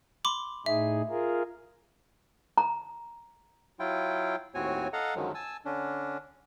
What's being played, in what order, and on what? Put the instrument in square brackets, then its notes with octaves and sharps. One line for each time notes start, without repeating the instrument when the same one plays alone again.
[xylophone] B5 C6 D6
[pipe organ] A2 D#4 G#4 [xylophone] E5
[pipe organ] F4 G#4 A#4
[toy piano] A#5
[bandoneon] F#3 E4 F4 G5
D#2 A2 C4 F#4 C#5 G#5
A4 D#5 F5 F#5 A#5
F#2 D3 D#3 F3 F#3 G#3
G#5 A5 E6
D3 C#4 D4